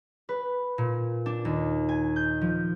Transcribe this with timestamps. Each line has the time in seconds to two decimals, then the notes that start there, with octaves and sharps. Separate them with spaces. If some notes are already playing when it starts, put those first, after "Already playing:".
0.29 B4
0.78 A#2
1.26 D4
1.45 D#2
1.89 G#5
2.16 G6
2.41 F3